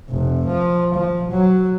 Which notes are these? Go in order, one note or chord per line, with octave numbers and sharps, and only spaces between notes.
F1
F3
F3
F#3